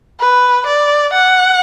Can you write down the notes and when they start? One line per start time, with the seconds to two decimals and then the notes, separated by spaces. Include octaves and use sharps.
0.20 B4
0.66 D5
1.13 F#5